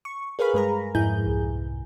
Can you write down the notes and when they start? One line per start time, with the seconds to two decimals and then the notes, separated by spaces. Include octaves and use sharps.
0.05 C#6
0.39 G#4 A#4 B4 F5 B5
0.54 G2 G#3 A#4 A#5
0.95 F2 G#2 E4 G#4 G6
1.26 C2